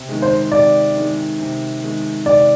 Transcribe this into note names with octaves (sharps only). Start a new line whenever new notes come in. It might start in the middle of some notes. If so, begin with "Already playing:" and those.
Already playing: C3
D#3 G#3
C5
C3 D5
D#3 G#3
C3
D#3 G#3
C3 D5